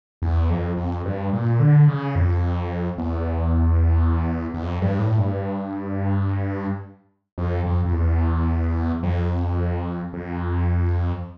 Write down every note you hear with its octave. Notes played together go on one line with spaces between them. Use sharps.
E2
F2
F2
G2
A#2
D3
C#3
F2
E2
E2
F2
G2
A2
G2
F2
F2
F2
E2
F2
F2